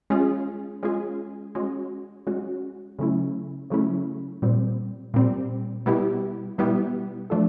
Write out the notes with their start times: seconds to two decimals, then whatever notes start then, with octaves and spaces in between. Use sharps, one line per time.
0.10 G#3 C#4 F4 G#4
0.83 G#3 C#4 F4 G#4
1.55 G#3 C#4 F#4
2.27 G#3 C#4 F#4
2.99 C#3 F#3 A3 C#4 E4
3.70 C#3 F#3 A3 C#4 E4
4.42 A#2 G3 C4
5.14 A#2 G3 C4
5.86 B2 G3 B3 E4 G4
6.58 B2 G3 B3 E4 G4
7.30 F3 A3 D4 F4 A4